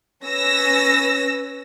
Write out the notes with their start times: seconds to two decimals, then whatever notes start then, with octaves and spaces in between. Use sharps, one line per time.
0.24 C#4 B4 E6 A#6